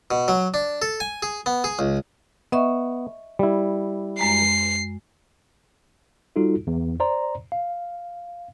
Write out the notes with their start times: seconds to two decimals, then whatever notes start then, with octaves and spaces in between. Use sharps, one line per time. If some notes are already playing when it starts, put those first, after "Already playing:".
0.11 B2
0.28 F#3
0.54 D4
0.82 A4
1.00 G#5
1.22 G#4
1.46 B3
1.64 G#4
1.79 C#2
2.52 B3 D#5 E5 C#6
3.39 G3 E4
4.19 F#2 G#3 A#5 C7
6.36 G3 D#4 F4 F#4 A4
6.67 E2
7.00 C5 D5 A#5 C6
7.52 F5